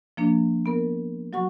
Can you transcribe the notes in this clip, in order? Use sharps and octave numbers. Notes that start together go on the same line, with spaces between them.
F3 A#3 D4
B3 A#4
F#3 F#4 F#5 C#6